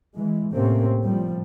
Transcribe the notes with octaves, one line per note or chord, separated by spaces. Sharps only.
E3 G#3
A2 C3 A#3 C4 C#4
A2 F3 G3